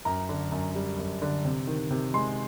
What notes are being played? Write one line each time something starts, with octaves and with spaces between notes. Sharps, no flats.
F#2 A#5
D3
F#2
G3
F#2
D3
C3
D#3
C3
G#3 C6